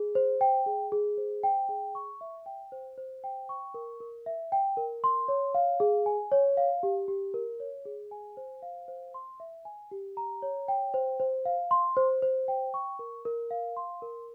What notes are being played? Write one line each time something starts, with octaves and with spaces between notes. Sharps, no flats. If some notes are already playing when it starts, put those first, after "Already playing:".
Already playing: G#4
C5
G5
G#4
G#4
C5
G5
G#4
C#6
E5
G5
C5
C5
G5
C#6
A#4
A#4
E5
G5
A#4
C6
C#5
F5
G#4
G#5
C#5
F5
G4
G4
A#4
C#5
G#4
G#5
C5
F5
C5
C6
E5
G#5
G4
A#5
C#5
G5
C5
C5
F5
C6
C5
C5
G5
C#6
A#4
A#4
F5
C6
A#4